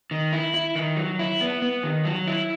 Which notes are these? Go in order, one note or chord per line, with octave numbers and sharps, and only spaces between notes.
D#3
E4
E4
D#3
F#3
E4
B3
B3
D#3
F#3
E4